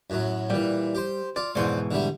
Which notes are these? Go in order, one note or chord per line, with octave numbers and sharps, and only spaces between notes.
F#2 A2 F#3
A#2 E3 G3
G4 C5
F4 D5
F2 G#2 B2 E3 C5 D5
D3 G3 A3